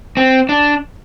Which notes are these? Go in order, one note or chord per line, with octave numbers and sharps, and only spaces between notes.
C4
D4